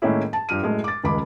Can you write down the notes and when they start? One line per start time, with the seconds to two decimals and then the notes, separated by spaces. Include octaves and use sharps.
0.02 A2 D#3 G#3 A#3 C#4 E4
0.33 A5
0.49 G2 F3 F6 D#7
0.62 F#2 A2 G#3 A3
0.84 D6 A6
1.03 D#1 C#2 G#3 B5 D6